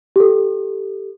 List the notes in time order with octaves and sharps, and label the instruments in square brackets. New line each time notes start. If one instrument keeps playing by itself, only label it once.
[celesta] G4 A4